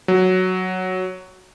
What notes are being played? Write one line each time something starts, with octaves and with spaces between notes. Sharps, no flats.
F#3